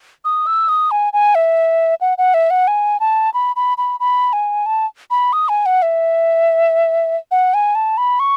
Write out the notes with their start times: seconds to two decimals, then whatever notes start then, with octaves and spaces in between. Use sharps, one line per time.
0.25 D#6
0.47 E6
0.69 D#6
0.91 G#5
1.13 G#5
1.35 E5
2.01 F#5
2.18 F#5
2.34 E5
2.50 F#5
2.68 G#5
3.00 A5
3.34 B5
3.56 B5
3.78 B5
4.00 B5
4.33 G#5
4.66 A5
5.11 B5
5.33 D#6
5.49 G#5
5.66 F#5
5.82 E5
7.31 F#5
7.54 G#5
7.75 A5
7.98 B5
8.20 C#6